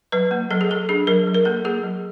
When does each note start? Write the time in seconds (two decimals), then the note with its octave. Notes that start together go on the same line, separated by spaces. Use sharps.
0.12 F#3 B4
0.31 A#3
0.51 F#3 A4
0.61 G#4
0.69 F#3 A4
0.89 D4 G#4
1.07 F#3 A#4
1.27 F#3
1.34 A#4
1.45 A#3 A4
1.65 A#3 G#4
1.83 F#3